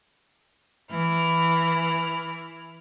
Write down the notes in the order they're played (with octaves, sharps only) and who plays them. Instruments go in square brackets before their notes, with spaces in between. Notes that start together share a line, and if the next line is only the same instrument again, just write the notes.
[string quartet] E3 E4 F6